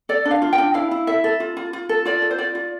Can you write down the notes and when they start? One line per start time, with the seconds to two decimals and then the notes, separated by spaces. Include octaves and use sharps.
0.09 A4 D5
0.25 D4
0.31 F5
0.42 F4
0.53 G5
0.58 D4
0.74 E4 F5
0.91 E4
1.07 A4 E5
1.24 A4
1.40 F4
1.57 F4
1.73 F4
1.89 A4
2.05 F4 D5
2.22 A4
2.31 C5
2.38 F4 D5
2.55 F4